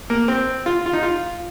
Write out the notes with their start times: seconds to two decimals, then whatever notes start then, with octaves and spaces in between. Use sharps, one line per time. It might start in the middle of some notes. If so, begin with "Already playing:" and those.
0.10 A#3
0.28 C4
0.66 F4
0.86 F4
0.93 D#4
1.03 F4